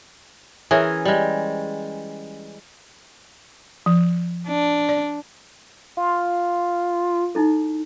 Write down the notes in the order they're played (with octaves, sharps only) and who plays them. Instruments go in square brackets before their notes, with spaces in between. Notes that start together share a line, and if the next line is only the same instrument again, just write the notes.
[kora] E3 C#4 G#4 A#4
G3 G#3
[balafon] F3
[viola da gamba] D4
[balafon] D5
[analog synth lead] F4
[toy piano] D#4 E4 A4